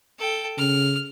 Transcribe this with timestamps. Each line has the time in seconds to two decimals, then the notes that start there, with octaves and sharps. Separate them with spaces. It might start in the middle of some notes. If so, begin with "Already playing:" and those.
0.19 A4 G5
0.58 C#3 F6